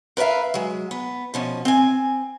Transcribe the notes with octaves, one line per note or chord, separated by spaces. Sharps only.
A#4 B4 D5 E5 F5
F#3 G#3
B3
B2 F3 C#4
C4 G#5